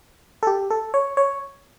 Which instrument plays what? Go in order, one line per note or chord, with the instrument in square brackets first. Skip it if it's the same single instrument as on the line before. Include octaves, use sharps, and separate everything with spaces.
[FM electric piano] A4
G4
A4
C#5
C#5